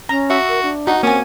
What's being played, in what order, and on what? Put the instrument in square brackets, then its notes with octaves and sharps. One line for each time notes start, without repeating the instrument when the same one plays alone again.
[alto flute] C#4 [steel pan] A#5
[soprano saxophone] F#4 [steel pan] E5
[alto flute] A#4
D4
[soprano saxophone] D#4 [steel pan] F#4
[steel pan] A#3 G#5 [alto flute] C4 [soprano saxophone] C#4